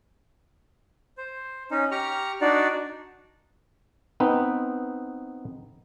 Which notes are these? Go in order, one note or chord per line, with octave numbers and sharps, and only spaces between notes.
C5
C#4 D#4
G4 A#5 C#6 F6
D4 D#4 F#4 D5
B3 C4 D#4 B4